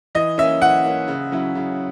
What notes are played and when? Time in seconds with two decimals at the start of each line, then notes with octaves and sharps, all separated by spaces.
0.15 E3 D#5
0.38 A#3 C#4 E5
0.61 E3 F#5
0.84 A#3 C#4
1.08 C#3
1.32 F#3 C#4 E4
1.55 C#3